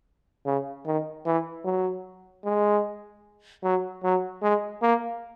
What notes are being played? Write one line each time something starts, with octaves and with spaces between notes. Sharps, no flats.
C#3
D#3
E3
F#3
G#3
F#3
F#3
G#3
A#3